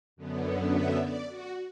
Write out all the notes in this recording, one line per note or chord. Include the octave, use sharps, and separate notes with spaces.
F#2 D3 B3
E5
D5
F#4